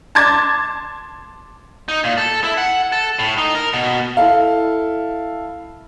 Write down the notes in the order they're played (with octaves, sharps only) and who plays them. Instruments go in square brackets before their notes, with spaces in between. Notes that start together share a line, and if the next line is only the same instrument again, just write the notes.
[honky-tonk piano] A5 C6 D6 G#6 A6
[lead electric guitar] D#4
A#2
A4
E4
F#5
A4
A2
D#4
A#4
B2
[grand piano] E4 A4 F5